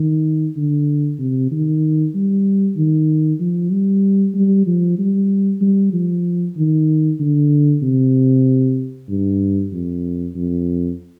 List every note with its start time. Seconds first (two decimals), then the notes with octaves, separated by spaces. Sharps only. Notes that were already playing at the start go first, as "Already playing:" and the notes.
Already playing: D#3
0.57 D3
1.19 C3
1.52 D#3
2.15 G3
2.77 D#3
3.40 F3
3.72 G3
4.35 G3
4.67 F3
4.98 G3
5.61 G3
5.93 F3
6.57 D#3
7.20 D3
7.82 C3
9.09 G2
9.72 F2
10.36 F2